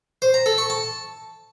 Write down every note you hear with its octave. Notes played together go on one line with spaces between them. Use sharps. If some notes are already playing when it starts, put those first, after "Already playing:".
C5
A#5
A4
C#6
A5